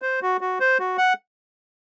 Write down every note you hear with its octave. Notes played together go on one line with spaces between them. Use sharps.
C5
F#4
F#4
C5
F#4
F#5